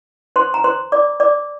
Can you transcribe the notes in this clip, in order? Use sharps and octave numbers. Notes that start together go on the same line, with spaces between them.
C5 C6
A#5
C5 C6
D5 D6
D5 D6